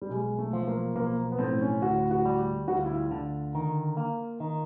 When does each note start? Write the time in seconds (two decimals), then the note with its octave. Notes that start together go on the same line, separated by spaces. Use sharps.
0.02 G3
0.10 B1 G#3
0.39 A3
0.53 F3
0.63 A3
0.68 A#3
0.96 B1 A#3
1.32 B3
1.39 A2 C4
1.61 C#4
1.82 D2 F#4
2.11 F#4
2.26 G3
2.68 D2 F#4
2.77 F4
2.85 E4
2.94 F4
3.11 D3
3.55 D#3
3.97 A#3
4.40 D#3